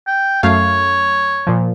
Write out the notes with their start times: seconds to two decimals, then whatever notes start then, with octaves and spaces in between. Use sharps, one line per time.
0.07 G5
0.43 F#2 A3 C#5 F5
1.47 A#2 F3